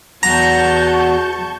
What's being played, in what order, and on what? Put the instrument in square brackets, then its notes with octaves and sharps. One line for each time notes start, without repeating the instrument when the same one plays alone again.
[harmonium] E2 F#4 [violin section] A5 C#6 G6 [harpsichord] A#5